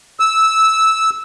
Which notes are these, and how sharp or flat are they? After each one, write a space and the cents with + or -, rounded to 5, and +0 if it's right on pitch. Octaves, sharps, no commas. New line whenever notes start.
E6 -10